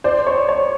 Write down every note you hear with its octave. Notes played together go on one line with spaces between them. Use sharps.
C5 D5
C#5
C#5